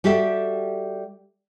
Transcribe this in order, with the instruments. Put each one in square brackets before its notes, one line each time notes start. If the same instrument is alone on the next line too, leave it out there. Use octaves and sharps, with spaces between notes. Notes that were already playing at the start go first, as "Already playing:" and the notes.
[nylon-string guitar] G3 F#4 G4 A4 E5